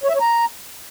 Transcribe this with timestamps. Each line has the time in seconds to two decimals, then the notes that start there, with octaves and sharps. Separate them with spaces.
0.03 C#5
0.09 E5
0.15 C#5
0.21 A#5